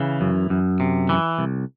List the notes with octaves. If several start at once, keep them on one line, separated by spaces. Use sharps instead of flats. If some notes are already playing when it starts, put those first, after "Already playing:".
Already playing: C#3 E3
F#2
F#2
C3
E3
C2